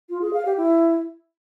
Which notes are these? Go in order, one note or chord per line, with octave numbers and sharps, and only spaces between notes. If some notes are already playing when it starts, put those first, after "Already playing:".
F4
G#4
F5
G4
E4